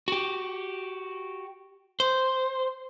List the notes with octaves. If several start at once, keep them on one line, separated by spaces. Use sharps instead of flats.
F#4 G4
C5